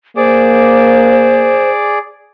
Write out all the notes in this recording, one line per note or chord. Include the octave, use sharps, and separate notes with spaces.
A#3 G#4 C5 D5 D6